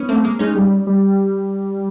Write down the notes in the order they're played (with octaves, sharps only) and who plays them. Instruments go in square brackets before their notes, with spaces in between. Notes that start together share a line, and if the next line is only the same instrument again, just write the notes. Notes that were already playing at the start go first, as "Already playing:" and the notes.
Already playing: [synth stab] B3 C#4
[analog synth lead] A3 [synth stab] A#3 C4
[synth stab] G#3 A#3
[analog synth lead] G#3 [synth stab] C#4 D#4
[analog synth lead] G3
G3